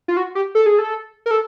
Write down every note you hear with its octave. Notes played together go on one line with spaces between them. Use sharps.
F4
F#4
G4
A4
G#4
A4
A#4
A4